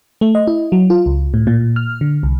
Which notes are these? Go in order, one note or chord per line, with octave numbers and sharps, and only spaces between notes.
A3
D#5
E4
F#3
F4
C#2
A2
A#2
F6
D3
C2